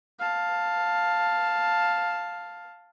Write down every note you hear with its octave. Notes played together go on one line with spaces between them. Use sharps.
F5 A5